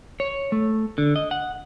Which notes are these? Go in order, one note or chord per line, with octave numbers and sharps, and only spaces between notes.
C#5
A3
D3
D#5
F#5